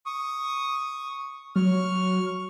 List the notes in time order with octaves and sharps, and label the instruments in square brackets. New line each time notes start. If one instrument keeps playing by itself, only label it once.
[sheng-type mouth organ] C#6 D#6
[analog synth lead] F#3 [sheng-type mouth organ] C#6 F6